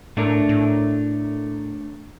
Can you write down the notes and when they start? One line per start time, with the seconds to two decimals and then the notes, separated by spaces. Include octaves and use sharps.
0.17 A2 A3 D4 A#4
0.49 A2